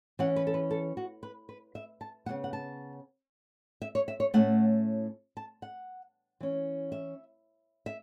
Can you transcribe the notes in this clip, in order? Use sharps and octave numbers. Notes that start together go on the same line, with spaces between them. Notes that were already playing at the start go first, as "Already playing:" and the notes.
E3 C#4 F#5
B4
A4
B4
A4
F#4
B4
B4
E5
A5
C#3 E3 B3 F#5
F#5
A5
E5
C#5
E5
C#5
A2 A3 C#4 F#5
A5
F#5
E3 C#4
E5
E5